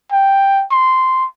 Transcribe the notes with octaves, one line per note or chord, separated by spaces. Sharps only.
G5
C6